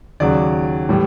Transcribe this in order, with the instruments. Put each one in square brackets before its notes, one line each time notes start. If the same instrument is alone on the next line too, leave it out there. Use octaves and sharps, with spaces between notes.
[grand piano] D#2 C#3 F#3 D5
A2 E3 G3